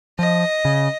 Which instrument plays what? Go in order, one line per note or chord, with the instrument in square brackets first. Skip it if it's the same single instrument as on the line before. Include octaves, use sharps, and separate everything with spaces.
[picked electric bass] F3 [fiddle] D#5
[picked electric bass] C#3